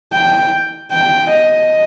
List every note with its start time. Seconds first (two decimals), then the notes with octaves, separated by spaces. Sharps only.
0.12 G5
0.91 G5
1.30 D#5